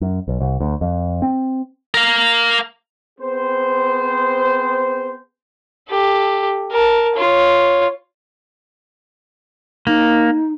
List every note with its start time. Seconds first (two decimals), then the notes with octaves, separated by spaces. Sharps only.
0.01 F#2
0.28 B1
0.40 C2
0.60 D2
0.81 F2
1.22 C4
1.94 A#4 F5
3.20 B3 C4 G#4 C5
5.89 G4 A4
6.71 A#4 A5
7.15 F4 C#5
9.87 A#3 D#4